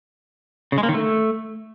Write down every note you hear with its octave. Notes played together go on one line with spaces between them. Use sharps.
C#3
G#3
A#3
D#3
A3